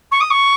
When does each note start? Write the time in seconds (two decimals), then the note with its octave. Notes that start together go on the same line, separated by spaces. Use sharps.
0.11 C#6
0.20 D#6
0.30 C#6